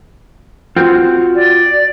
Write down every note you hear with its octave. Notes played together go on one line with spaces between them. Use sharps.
C4 F4 F#4
D5